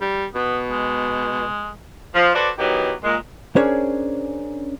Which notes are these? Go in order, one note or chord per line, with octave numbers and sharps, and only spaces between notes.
G3
B2 B3
G#3
F3
F#4 A4 B4 C5 D5
D#3 E3 F#3 B3 D#4 G4
A#2 G#3
C#4 D4 G#4 A#4 C5 C#5